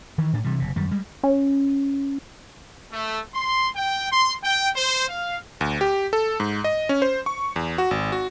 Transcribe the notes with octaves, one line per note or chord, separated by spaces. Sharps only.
D#3 E3
A2 D4
C3 E3 G3
F#1 C3
F#2 D#3 G3
G3 G#3
C#4
A3
C6
G5
C6
G5
C5
F5
D2
G4
A4
G#2
D#5
C#4
C5
C#6
E2
F#4
G#1
F#4